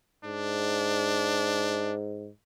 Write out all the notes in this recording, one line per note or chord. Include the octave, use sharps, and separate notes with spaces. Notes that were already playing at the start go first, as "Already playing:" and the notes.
G#2 D4